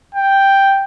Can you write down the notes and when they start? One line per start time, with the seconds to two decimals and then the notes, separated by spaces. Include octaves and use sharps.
0.14 G5